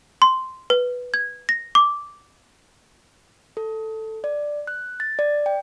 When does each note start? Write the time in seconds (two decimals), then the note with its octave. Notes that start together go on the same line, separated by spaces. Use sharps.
0.22 C6
0.70 B4
1.14 G#6
1.49 A#6
1.75 D6
3.57 A4
4.24 D5
4.67 F#6
5.00 A6
5.19 D5
5.46 G5